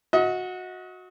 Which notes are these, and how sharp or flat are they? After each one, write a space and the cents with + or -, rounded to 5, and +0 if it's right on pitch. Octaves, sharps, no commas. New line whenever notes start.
F#4 -15 D#5 +35